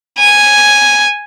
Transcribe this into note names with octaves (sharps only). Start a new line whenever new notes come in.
G#5